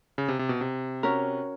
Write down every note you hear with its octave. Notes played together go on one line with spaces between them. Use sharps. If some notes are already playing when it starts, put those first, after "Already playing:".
C#3
C3
C3
B2
C3
C#4 F#4 A#4 C#5